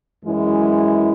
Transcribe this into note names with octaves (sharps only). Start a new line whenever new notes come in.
F#2 E3 G#3 E4